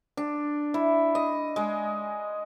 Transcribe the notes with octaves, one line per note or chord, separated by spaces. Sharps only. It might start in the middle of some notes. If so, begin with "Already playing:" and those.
D4
E4
D#5
G#3